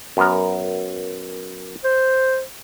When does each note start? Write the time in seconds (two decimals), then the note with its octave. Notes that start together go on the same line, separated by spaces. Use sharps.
0.17 F#2 B3 A#4
1.84 C5